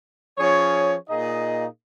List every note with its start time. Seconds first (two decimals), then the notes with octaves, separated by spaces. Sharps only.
0.38 F3 C#4 G#4 C#5
1.09 A#2 A#3 D#4 G#4 D#5